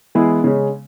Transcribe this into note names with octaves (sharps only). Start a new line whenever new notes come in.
E3 G#3 B3 E4 G#4
C#3 G#3 C#4